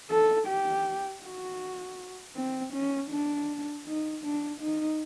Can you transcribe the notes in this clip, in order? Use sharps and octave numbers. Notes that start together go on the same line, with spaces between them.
A4
G4
F#4
C4
C#4
D4
D#4
D4
D#4